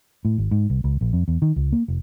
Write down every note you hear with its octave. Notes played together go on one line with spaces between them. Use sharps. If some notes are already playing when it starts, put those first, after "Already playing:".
A2
G#1
G#2
C2
C#2
A#1
F2
E2
D#3
C#2
A#3
F1